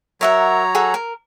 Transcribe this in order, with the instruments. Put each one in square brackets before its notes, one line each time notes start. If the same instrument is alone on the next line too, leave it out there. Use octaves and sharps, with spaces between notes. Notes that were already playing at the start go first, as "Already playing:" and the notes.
[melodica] F#3 C#5 A#5 [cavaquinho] A#4 E5 F#5
[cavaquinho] G#4 A4 F#5
A#4